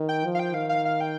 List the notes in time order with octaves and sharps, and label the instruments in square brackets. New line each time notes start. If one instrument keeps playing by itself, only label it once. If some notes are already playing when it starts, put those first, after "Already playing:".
Already playing: [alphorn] D#3
[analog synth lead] G5
[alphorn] F3
[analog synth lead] F5
G5
[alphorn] D#3 [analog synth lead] F5
[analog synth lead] F5
F5
G5